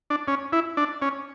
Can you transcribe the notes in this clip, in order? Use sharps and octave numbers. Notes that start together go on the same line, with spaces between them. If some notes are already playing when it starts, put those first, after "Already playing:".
D4
C#4
E4
D4
C#4